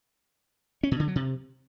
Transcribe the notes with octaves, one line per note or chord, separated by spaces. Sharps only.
C#4
B2
D3
F#3
C3